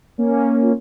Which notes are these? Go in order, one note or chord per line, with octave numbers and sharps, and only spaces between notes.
A#3 C#4
F4